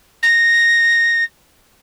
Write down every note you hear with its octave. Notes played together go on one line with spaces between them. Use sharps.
A#6